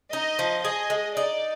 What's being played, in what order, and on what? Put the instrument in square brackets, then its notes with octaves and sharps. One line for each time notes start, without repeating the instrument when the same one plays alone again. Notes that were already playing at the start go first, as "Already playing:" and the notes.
[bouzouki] D#4 [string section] D#5
[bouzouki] F3
[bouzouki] G#4 [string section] D#5
[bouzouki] G#3
[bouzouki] D#4 [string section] D5